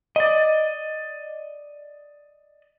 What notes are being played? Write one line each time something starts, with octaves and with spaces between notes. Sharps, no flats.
D5 D#5